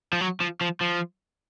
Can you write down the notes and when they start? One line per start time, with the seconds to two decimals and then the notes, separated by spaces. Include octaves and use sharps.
0.13 F3
0.21 F#3
0.41 F3
0.61 F3
0.81 F3